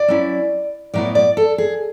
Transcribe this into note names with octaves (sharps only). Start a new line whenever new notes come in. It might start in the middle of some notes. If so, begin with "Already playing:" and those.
Already playing: D5
F#3 C#4 E4
A2 F#3 B3 E4 D5
D5
A4
G#4